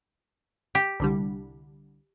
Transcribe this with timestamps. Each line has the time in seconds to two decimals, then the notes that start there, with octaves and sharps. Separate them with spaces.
0.75 G4
1.00 C2 D3 G3